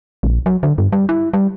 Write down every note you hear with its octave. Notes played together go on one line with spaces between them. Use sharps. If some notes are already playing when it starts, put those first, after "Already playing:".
A#1
F#3
D3
G2
G3
E4
G3